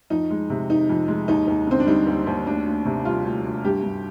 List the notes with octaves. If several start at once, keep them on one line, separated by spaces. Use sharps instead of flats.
F2 D#4
G#3
C3
D#3 D#4
F2
G#3
D#2 D#4
D#2
D3 C4
D4
G3 D#4
D#2
D#2
D2 D4
D2
C3
G3 F4
D2
D2
G2 G4
G2